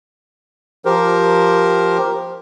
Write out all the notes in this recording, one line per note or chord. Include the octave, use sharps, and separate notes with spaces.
F3 G4 A#4 C5